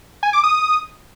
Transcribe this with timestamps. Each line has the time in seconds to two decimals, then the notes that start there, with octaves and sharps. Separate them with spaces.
0.23 G#5
0.33 D6
0.43 D#6